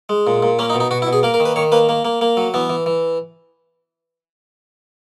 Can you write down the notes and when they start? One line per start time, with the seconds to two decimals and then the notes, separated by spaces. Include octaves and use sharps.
0.09 G#3
0.27 A#2
0.43 A#2
0.59 A#3 C#4
0.70 D#4
0.74 B2
0.80 D#4
0.91 B2 F#4
1.02 E4
1.07 B2
1.13 G#4
1.23 A#3 A#4
1.34 A#4
1.40 D#3
1.45 B4
1.56 D#3 C#5
1.72 A#3 B4
1.89 A#3
2.05 A#3
2.21 A#3
2.37 F#3
2.54 E3 B3
2.70 E3
2.86 E3